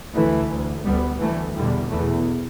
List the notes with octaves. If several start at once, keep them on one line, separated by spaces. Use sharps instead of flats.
D2 E3 A3
D2
D2 G3 B3
D2 E3 A3
E2 B2 D3 G3
E2 B2 E3 A3